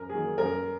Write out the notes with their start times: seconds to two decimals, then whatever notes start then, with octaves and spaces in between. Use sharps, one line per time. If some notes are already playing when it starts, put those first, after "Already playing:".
Already playing: F#2 A#4
0.10 D#3 F#3 A#3 G#4
0.38 F#2 A#4